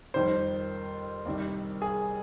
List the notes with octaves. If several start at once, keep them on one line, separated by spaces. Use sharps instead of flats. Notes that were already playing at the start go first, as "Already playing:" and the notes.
F2 D#3 G3 C5
C2 C3 D#3 G3
G#4